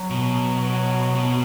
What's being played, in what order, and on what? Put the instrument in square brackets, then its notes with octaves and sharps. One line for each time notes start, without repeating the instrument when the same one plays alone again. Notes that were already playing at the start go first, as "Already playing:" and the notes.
Already playing: [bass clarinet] F#3
[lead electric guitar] B2
B2